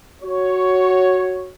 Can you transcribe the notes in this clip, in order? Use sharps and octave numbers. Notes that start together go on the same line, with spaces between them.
F#4 C#5